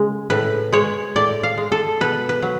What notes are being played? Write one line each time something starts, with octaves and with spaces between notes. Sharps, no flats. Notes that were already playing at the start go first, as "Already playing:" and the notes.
Already playing: C#3 G#3
A2 B4
G#3 C#5
A2 D5
F5
G#3
A4
B2 B4
B4
F#3